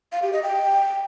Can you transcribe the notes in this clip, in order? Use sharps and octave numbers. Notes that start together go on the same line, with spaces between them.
F5
G4
D#5
G5